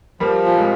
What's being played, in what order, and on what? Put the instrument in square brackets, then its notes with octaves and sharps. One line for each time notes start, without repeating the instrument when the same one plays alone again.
[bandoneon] F3 [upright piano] G3 A#3
[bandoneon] A#2
[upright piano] G#3 C4